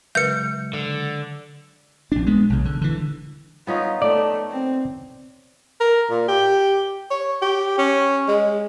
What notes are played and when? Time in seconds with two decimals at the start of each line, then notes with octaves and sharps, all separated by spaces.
0.15 C#3 F#3 G#3 B4 E5 G6 C#7
0.74 D3
2.12 A#1 D4
2.26 G#3 B3
2.50 B1 C#3
2.65 D3
2.81 D3 E3
3.67 B3 C#4 D#4 F4
4.02 A3 D5
4.50 C4
5.80 A#4
6.10 A#2
6.28 G4
7.11 C#5
7.42 G4
7.78 C#4
8.28 G#3